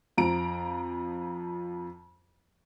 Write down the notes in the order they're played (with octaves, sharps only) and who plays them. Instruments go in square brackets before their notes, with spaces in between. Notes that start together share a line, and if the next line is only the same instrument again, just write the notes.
[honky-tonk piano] F2 F3 A#5 D7